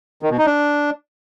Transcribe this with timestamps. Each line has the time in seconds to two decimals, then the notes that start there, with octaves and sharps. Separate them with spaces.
0.22 D#3
0.30 B2
0.38 D#4
0.46 D4